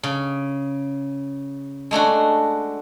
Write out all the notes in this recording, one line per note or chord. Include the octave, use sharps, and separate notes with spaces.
C#3
G#3 A3 D4 F#4